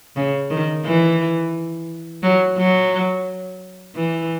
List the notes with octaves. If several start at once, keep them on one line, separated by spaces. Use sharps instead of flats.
C#3
D#3
E3
F#3
F#3
E3